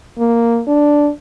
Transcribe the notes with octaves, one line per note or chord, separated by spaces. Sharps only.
A#3
D4